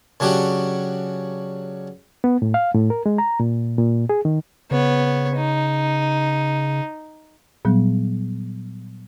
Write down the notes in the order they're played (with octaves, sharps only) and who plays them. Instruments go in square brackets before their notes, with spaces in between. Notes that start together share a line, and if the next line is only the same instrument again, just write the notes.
[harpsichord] C#3 F#3 D4 F#4 G4
[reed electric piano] B3
A2
F5
A2
A#4
G#3
A#5
A#2
A#2
G#4
D#3
[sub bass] C#3 [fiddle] B3 C#5
[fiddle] D#4
[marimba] A#2 F#3 G3 B3